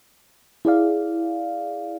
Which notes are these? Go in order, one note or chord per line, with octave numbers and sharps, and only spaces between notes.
E4 G#4 D5 F5